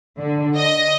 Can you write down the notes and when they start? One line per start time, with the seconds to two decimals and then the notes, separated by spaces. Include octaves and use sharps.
0.19 D3
0.57 D#5